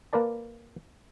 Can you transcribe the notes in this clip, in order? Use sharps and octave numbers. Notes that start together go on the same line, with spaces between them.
A#3 A#4 B4 D5 A5